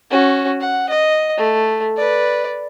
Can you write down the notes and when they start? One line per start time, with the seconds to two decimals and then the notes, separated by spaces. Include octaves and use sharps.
0.10 C#4 F#4
0.61 F#5
0.89 D#5
1.38 A3
1.97 B4 D5